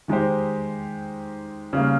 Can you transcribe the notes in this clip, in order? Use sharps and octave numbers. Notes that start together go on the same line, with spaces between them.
D#3 G#3 D#4 G4 C5
C#3 G3 A#3